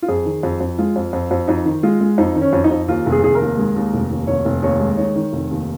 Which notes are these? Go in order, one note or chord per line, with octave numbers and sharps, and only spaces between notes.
F4
F2 G#4
D#3
F2
F2
G#3 F4
F2
F2
F2
F2 D#4
D#3
G#3 F4
G#3
F2 D#4
D#3
C#4
F2
D#4
F2
D#2 F4
F1
G#4
F1 G#4
A#4
D#2
G#3
D#2
F1
D#2
F1 C#5
F1
D#2 C#5
G#3
D#3 C#5
D#3
F1
D#2